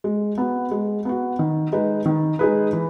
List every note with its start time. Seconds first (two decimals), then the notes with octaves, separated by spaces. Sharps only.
0.04 G#3
0.38 B3 F#4
0.71 G#3
1.05 B3 F#4
1.39 D#3
1.72 G#3 D#4 G#4 B4
2.06 D#3
2.39 G#3 D#4 G#4 B4
2.73 E3